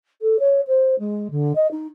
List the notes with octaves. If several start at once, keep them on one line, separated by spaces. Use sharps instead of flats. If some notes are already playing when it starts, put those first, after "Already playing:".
A4
C#5
C5
G#3
D3
D#5
D#4